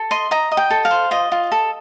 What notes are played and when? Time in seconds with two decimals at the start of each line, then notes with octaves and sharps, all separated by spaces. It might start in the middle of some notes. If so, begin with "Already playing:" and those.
Already playing: A4
0.11 D#5 C6
0.31 D#5 A#5
0.51 D#5
0.57 G5
0.70 A4
0.85 F5
0.91 C5
1.11 F4 D#5
1.32 F4
1.52 A4